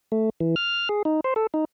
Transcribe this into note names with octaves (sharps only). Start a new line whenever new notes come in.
A3
E3
F6
G#4
D#4
C5
A4
D#4